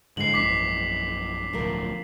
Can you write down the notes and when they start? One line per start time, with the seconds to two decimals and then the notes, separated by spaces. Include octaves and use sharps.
0.17 G#2 D3 E3 G#3 C7 F#7
0.34 A#1 F#2 D6 B6
1.53 D1 B1 F3 A3 A#4